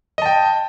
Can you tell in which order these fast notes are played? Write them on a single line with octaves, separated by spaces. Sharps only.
D#5 A5 G5